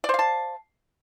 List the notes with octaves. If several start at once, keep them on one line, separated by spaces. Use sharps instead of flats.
C5 D5 F5 A5